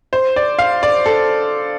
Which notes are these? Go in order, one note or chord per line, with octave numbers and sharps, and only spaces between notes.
C5
D5
F5
D5
A4